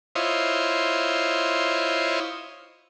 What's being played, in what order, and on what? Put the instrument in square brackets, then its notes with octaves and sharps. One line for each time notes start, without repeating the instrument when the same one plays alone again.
[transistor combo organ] E4 F4 C5 C#5 D#5